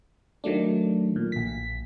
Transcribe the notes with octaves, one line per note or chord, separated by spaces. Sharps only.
D#3 F#3 A3 D4
A#2
A#1 B6